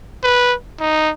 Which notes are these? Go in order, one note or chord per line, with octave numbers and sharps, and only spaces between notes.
B4
D#4